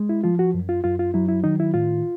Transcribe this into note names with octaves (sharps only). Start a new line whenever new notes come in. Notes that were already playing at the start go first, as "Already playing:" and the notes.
Already playing: G#3
E4
F3 F4
F#4
F#2
F4
F#2 F4
F4
F#3 E4
E4
D#3 D#4
E4
A2 F4